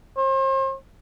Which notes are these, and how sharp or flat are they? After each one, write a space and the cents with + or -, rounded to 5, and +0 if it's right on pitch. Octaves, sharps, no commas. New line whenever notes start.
C5 +40